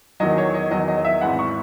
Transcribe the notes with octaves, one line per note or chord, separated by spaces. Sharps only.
E2 D#3 F#3 D#5
C#5
D#5
E2 D#3 F#3 D#5
D#5
E5
G#1 G#2 E3 F#5
C#6